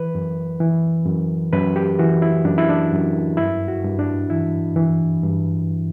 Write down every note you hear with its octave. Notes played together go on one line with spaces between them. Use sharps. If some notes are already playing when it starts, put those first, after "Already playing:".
Already playing: E3 B4
F#2
E3
F#2
F#2 B4
G4
E3 F#4
E4
F#2 D4
E4
D4
F#2
G2 E4
F#4
G2
D4
E3 E4
E3
G2